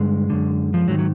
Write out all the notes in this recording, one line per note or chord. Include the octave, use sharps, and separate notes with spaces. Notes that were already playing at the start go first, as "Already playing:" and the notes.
Already playing: G2 D3 G#3
F#2 D3
F3
G#2 D#3 F#3
F#3